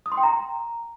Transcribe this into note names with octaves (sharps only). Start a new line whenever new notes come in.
D#6
C6
G5
A#5